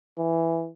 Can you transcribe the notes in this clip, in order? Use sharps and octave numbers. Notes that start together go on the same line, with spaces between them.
E3